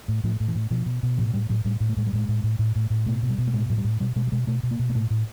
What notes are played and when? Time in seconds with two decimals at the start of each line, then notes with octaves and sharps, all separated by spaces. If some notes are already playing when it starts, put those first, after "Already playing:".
0.08 A2
0.24 A2 F3
0.40 A2
0.48 E3
0.55 A2
0.71 B2 F3
0.86 B2
1.03 B2
1.18 A2 F3
1.34 A2 G3
1.49 A2 F#3
1.65 A2 G3
1.80 A2
1.89 A3
1.97 A2 G#3
2.07 G3
2.13 A2 G#3
2.28 A2
2.43 A2
2.59 A2
2.76 A2
2.90 A2
3.06 B2 A3
3.23 B2
3.30 G3
3.38 B2
3.47 A3
3.53 A2 G#3
3.69 A2 F#3
3.78 G3
3.84 A2
4.00 B2 G3
4.16 B2 G#3
4.27 G3
4.32 B2 G#3
4.47 B2 A3
4.63 B2
4.71 A#3
4.79 B2
4.89 A#3
4.95 A2 A3
5.10 A2